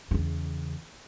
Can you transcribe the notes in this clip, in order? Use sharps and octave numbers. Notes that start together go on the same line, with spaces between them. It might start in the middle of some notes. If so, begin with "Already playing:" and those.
E2 C#3